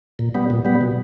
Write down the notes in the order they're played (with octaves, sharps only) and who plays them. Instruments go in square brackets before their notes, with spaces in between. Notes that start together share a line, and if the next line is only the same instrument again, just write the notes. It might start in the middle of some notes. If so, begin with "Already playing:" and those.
[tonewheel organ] A#2
G3 B3
A#2
G3 B3
B2